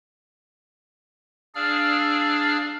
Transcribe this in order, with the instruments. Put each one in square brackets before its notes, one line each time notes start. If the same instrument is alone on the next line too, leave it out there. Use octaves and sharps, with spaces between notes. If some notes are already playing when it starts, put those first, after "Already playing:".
[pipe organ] D4 G#4 D5 F5 E6 F6